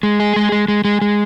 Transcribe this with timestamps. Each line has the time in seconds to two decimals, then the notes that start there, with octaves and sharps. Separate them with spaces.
0.03 G#3
0.20 G#4
0.36 G#3
0.52 G#3
0.68 G#3
0.85 G#3
1.02 G#3